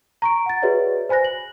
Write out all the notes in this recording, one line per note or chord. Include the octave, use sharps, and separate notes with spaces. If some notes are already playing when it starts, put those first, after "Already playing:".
A#5 C#6 D7
F#5 A6
F#4 G#4 B4 C#5 D5 E5
C5 G#5 B5 F#6 A#6
F#7